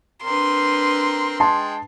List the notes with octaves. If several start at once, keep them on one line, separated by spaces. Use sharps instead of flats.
C4 D4 A#4 B4 C6
G#3 G5 A5 C6